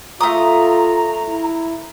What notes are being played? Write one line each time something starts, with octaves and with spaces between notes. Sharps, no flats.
A3 F4 A#5 D#6
E4